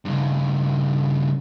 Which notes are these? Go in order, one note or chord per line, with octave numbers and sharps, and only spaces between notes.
G2 C#3